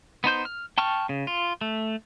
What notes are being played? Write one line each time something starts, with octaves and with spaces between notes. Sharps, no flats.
B3 D#4 C5 G6
F6
G5 A5 C#6 F6
C#3
F4
A3